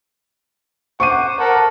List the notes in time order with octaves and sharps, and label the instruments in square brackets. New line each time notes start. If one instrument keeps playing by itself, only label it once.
[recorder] C5 [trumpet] F#5 [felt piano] C#6 D6 D#7
[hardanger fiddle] A4 [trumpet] A#4 [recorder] F#5